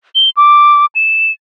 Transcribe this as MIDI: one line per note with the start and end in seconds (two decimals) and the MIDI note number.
0.15 0.30 103
0.37 0.86 86
0.95 1.32 100